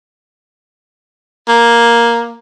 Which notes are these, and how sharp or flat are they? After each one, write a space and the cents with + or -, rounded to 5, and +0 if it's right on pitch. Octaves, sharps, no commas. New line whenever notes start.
A#3 +5